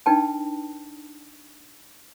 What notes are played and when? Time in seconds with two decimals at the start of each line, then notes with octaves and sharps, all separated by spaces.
0.06 D4 D#4 B4 G5 A5